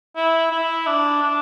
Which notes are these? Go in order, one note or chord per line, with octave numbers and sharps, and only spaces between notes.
E4
E4
D4
D4